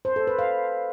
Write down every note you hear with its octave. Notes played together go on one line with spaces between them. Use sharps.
C5
A4
B4
F5